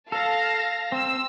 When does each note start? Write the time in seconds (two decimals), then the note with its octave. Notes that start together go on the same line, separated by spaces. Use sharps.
0.12 A4 F5 A5 A#6
0.92 C4 E6